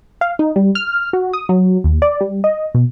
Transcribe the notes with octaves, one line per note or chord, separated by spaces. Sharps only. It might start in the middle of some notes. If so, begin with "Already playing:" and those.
F5
D#4
G3
F6
F#4
D#6
F#3
D#2
D5
G3
D#5
B2